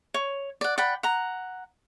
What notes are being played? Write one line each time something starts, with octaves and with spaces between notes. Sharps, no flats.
C#5
D5 F#5
D5 F#5 G5 B5
F#5 A#5